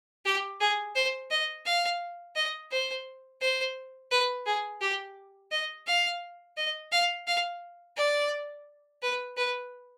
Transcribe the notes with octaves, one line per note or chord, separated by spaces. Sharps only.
G4
G#4
C5
D#5
F5
D#5
C5
C5
B4
G#4
G4
D#5
F5
D#5
F5
F5
D5
B4
B4